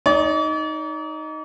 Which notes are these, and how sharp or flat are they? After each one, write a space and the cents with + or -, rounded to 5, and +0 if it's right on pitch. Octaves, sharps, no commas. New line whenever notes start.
D#4 +0 D5 -45